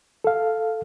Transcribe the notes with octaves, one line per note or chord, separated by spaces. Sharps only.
A4 F5